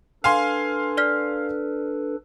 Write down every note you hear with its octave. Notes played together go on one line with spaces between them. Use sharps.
D4 A4 B4 F5 G#5 C6
D5 F6 B6